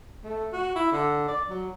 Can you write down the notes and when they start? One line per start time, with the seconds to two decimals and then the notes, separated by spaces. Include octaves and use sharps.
0.24 A3
0.52 F#4
0.75 E4
0.92 D3
1.28 D5
1.49 F#3